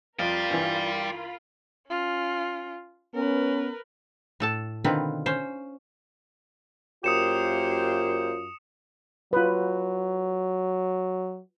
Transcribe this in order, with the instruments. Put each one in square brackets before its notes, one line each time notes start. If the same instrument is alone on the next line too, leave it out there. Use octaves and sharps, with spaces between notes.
[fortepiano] F2 F5 [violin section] F4 A#4 B5 [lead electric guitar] D5 G5
[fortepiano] G2 E3
[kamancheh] C#4 F4
[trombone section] B3 C#4 [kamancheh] A#4 B4
[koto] A2 A4 A5
B2 D3 D#3 C4 F4 B4
C#4 C5
[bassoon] F#2 [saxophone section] A#3 G4 C5 [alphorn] F4 [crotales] D#6 C#7 E7
[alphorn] F#3 [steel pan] F4 B4